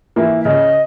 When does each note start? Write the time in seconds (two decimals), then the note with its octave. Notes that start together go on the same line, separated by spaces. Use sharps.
0.16 E3 A#3 E4
0.41 E5
0.45 C#3 D#5